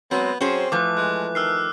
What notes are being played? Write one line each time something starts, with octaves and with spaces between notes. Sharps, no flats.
F#3 G#3 B3 C4
F#3 C4 C#4 G#4 C5
E3 F3 A3 D6 F#6
G#3 F#6
D#3 E6 F6 C7